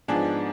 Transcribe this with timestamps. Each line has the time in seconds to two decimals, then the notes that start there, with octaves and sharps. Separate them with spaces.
0.08 G#2 F3 B3 D4 G#4